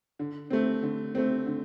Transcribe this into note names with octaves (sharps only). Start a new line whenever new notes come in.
D3
A3 C4
D3
A3 C4
D3